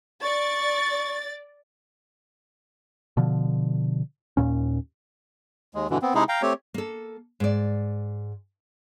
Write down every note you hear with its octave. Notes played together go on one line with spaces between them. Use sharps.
D5 C#6 A6
B2 D3 F3
D#2 A#2 C#4
D#2 G#3
G2 B2 D3 E3
B3 C4
C3 G#3 D#4 E4 G#4
F5 G5 A#5
A3 C4 G4 C#5
A#3 A4
G#2 D5